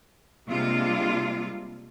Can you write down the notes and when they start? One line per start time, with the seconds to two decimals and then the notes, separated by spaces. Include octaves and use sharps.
0.49 C3 G3 G#3 A#3 D4 F4